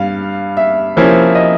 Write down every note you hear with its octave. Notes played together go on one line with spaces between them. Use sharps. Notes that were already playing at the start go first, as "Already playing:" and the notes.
Already playing: G2 G3 F5
E5
C3 F3 A#3 C#4 E4
D#5